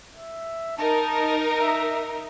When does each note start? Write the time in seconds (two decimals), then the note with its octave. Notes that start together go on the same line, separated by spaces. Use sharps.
0.14 E5
0.78 D#4 A#4 A5
1.61 E5